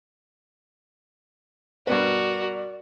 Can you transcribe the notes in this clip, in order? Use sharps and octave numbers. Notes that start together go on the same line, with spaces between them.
G2 B2 F#4 A#4 B4 D5